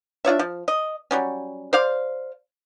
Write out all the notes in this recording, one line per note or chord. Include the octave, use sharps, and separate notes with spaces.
D4 F4 C#5 E5
F3
D#5
F#3 G3 C#4
C5 D5 F5